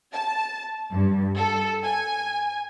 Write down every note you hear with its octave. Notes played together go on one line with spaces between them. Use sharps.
A5
G2
A4
G#5